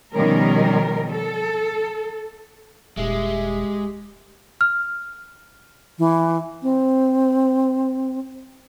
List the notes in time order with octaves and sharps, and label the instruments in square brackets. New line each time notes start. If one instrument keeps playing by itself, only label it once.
[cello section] B2 D#3 F3 G3 C#4 A#4
A4
[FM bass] D#1 [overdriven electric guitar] G#3 [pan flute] G4 [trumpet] E5
[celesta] F6
[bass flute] E3
C4